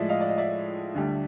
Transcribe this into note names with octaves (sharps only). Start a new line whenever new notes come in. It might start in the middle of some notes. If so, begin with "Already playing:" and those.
Already playing: A2 F3 G#3 D5 E5
D#5 F5
D5
D#5
D5 E5
D2 D3 G3